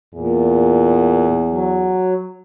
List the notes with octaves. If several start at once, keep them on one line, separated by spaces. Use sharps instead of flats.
E2 A#2
F#3